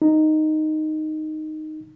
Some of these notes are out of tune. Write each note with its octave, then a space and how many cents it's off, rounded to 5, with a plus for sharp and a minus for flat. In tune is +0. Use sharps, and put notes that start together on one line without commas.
D#4 -5